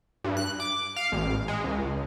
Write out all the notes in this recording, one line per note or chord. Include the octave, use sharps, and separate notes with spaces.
G2
F#6
D6
F5
A1
G#3
C#2